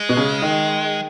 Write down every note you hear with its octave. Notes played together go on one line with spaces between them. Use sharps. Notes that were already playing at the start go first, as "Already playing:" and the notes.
Already playing: G#3
B2
C#3
D#3